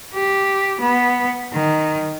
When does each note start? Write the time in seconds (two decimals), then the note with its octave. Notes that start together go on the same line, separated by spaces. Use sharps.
0.14 G4
0.80 B3
1.53 D#3